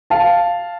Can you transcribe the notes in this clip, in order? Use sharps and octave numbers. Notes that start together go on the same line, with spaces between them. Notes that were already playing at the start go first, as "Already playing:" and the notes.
F5 A5